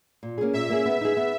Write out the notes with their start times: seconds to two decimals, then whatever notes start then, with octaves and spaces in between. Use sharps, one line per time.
0.23 A#2
0.38 A#3 C#4 G#4
0.53 A#2 E5
0.70 A#3 C#4 G#4
0.86 B3
1.01 D#4 G#4
1.17 B3